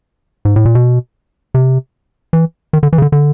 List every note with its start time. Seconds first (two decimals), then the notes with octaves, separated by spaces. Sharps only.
0.45 G#2
0.56 A2
0.65 A#2
0.75 B2
1.54 C3
2.33 E3
2.73 D#3
2.83 D3
2.93 E3
2.98 C#3
3.02 D3
3.12 D3